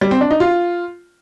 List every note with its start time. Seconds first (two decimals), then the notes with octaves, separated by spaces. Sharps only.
0.01 G3
0.11 C4
0.21 D4
0.31 D#4
0.40 F4